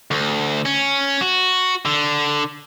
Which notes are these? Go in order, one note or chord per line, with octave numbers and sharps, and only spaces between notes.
D2
C#4
F#4
D3